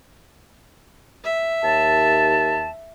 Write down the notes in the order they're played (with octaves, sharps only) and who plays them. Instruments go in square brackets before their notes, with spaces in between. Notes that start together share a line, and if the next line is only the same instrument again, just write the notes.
[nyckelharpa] E5
[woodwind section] D#2 A5